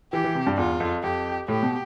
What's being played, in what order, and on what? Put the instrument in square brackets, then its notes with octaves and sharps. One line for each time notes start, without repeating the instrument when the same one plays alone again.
[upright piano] E3 [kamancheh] G4
[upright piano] E3
C3
G2
[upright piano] E2 [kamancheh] F4
[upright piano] F2
[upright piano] F2 [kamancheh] G4
[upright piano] A2 [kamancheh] G4
[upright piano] B2